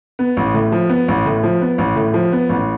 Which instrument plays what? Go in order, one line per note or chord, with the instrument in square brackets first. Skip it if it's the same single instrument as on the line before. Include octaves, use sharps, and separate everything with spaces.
[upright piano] B3
A1
A2
F3
B3
A1
A2
F3
B3
A1
A2
F3
B3
A1